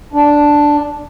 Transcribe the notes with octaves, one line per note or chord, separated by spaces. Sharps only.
D4